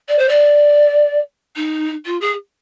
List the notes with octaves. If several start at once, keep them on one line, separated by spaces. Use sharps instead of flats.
D5
C5
D5
D#4
F4
G#4